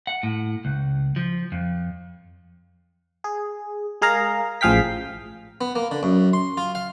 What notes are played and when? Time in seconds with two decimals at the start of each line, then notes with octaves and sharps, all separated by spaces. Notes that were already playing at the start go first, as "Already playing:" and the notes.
0.07 F#5
0.23 A2
0.65 C#2
1.16 F3
1.52 F2
3.24 G#4
4.02 G#3 G#4 A#4 F5 A#5
4.61 A1 F3 G#4 F5 G5 B6
5.61 B3
5.75 A#3
5.91 D3
6.03 F#2
6.33 C6
6.57 F4
6.75 F5